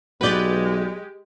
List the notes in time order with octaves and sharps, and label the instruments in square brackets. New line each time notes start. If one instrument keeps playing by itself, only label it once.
[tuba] B1 [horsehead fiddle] G#3 G4 [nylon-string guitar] F#4 D5 [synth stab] B4 G6 A6